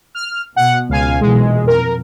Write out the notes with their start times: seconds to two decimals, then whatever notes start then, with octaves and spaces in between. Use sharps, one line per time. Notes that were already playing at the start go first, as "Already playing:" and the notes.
0.15 F6
0.56 B2 F#5
0.89 C#2 F5 G#5
1.21 B1 A#2 E3 G#3
1.67 F2 A#4